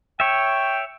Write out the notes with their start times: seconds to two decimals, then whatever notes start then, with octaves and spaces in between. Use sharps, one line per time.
0.20 C#5 E5 G5